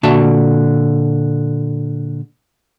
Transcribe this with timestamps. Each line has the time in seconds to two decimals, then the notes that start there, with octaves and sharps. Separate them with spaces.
0.03 A#2 D3 F#4 E5 A5